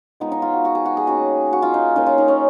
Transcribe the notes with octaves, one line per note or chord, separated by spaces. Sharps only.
F3 G#3 B3 D#4
D#4
F4
F#4
F#4
G#4
F#4
G#4
D#3 A#3 C#4 F#4
F#4
F4
D#4
F3 A#3 C#4 D#4
F4
D#4
C#4